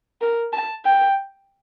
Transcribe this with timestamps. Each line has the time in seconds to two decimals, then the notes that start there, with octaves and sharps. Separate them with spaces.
0.21 A#4
0.53 A5
0.85 G5